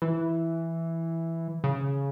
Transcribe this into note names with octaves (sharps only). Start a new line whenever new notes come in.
E3
C#3